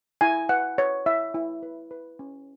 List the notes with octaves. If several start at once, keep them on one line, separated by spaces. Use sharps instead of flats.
E4 G#5
B4 F#5
B4 C#5
E4 E5
E4
B4
B4
C#4